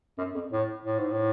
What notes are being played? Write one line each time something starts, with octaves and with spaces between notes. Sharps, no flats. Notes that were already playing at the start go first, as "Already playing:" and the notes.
F#2
F2
A2
A2
G#2
A2